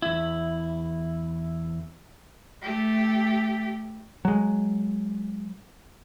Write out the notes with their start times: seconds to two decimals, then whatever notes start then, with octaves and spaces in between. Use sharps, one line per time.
0.02 E2 E4
2.62 A3 G4
4.25 F#3 G#3